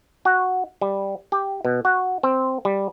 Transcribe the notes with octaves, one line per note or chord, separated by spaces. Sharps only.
F#4
G3
G4
B2
F#4
C4
G3